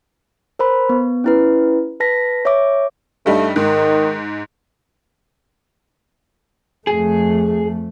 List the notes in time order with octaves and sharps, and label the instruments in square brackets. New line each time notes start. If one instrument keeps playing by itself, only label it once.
[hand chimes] A#4 C5 B5
B3
C#4 E4 B4
B4 A5 A#6 B6
C#5 E5 D6
[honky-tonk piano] G2 G3 D#4 [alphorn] A3
[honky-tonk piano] G#2 [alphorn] D#3
[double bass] F2 A3 [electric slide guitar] G#4